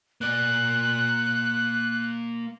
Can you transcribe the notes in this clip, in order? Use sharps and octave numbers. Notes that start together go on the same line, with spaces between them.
A#3 D5 F#6